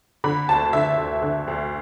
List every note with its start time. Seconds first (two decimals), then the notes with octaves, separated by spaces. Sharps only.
0.24 D3 B5
0.49 D2 A5
0.73 D3 E5
0.97 D2
1.22 D3
1.47 D2